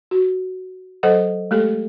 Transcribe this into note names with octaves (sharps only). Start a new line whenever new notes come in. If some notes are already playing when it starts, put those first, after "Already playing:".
F#4
F#3 A4 C5 D#5 F#5
G#3 A3 G4 A4